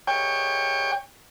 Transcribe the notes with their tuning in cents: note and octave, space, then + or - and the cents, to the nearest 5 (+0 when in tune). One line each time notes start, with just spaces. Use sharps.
C#5 +0 G5 +25